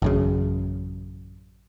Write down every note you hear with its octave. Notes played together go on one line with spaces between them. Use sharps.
A1 F#2 C#3